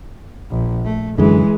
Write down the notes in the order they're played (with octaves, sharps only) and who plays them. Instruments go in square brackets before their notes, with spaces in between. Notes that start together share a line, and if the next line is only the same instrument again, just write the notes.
[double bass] A#1
A3
[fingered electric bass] F#2 D3 [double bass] E3 [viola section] G#3